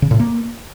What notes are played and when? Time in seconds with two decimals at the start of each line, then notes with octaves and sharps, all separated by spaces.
0.02 C#3
0.11 A2
0.19 A#3